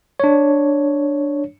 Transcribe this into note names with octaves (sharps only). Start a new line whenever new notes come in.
D4 C#5